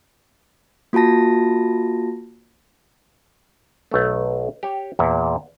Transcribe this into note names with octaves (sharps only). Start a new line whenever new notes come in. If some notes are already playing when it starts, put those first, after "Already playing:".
A#3 F4 F#4 A5 A#6
B1 A3
G4 C#5
E2 A#2